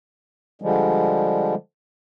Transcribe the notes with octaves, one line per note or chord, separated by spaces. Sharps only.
D3 F3 G3 G#3